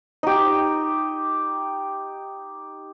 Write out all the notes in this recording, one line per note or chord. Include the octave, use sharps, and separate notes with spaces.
D#4 G4